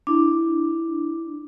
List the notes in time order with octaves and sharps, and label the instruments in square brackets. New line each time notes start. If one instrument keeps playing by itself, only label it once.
[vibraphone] D4 [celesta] E4 D6